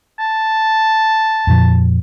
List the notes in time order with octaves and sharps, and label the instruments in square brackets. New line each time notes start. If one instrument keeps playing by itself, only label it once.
[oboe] A5
[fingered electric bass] F2 A#2 F3